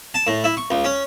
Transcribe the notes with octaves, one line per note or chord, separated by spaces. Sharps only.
A5
A2
E4
C#6
C#2
C#4